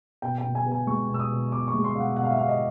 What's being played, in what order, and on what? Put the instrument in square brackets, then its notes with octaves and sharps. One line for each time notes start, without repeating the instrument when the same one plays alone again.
[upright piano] B2 G5
G5
B2
G#5
B3
G#5
G#3 C#6
B2 E6
D#6
B2
B3 D6
C#6
G#3
C6
B2 F5
F#5
B2 F#5
F5
E5
B3 F5
D#5